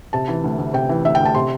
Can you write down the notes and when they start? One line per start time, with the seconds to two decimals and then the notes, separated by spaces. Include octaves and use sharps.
0.13 C3 A5
0.28 E3
0.44 D2
0.58 D2
0.74 C3 G5
0.89 E3
1.05 D2 E5
1.15 G5
1.20 D2
1.25 A5
1.35 C3 C6